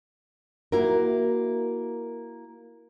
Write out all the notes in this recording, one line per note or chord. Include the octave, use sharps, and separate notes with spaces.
A#3 E4 F#4 A#4